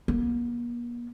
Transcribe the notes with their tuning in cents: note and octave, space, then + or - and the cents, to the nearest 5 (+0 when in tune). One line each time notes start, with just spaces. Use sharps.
A#3 +45